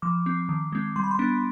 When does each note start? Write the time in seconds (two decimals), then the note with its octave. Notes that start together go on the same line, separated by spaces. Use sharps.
0.02 F3 D6
0.26 C4
0.49 D#3
0.72 G#3 C4
0.96 G3 C6
1.03 B5
1.11 C6
1.19 B3 D4